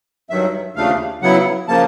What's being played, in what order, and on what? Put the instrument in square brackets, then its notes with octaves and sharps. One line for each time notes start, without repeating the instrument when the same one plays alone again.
[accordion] G2 D#3 F#3 E5
D#2 C#3 F3 A3 D4 F5
C#3 F#3 B3 E4 F#5
C#3 F3 A#3 A5